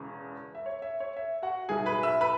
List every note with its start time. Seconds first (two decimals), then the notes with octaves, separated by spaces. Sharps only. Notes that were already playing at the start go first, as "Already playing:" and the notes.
Already playing: E1 E2 C#3
0.55 E5
0.66 C#5
0.82 E5
1.00 C#5
1.16 E5
1.42 F#4 F#5
1.68 B1 B2 F#3 E4 G#4 G#5
1.86 B4 B5
2.03 E5 E6
2.21 B4 B5